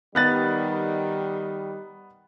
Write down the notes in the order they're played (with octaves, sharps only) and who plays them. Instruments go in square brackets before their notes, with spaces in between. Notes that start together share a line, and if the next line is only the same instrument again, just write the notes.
[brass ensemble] D#3 G3 [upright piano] B3 F#6 A6